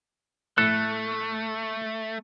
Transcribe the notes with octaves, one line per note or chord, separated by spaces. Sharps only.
A2 A3 A4 F#6